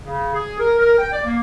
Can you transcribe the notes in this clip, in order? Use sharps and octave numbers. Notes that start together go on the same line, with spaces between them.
C#3
G#4
A#4
A#4
G5
D5
A#3